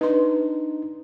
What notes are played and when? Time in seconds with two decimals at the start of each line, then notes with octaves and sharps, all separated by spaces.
0.01 D4 D#4 B4 C6